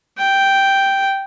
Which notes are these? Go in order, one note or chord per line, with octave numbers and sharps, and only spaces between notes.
G5